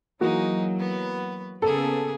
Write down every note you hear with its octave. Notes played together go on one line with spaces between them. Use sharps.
E3 F#3 G#3 A#3 D#4 F#4
B3 B4
C#3 A#3 B3 G#4 A4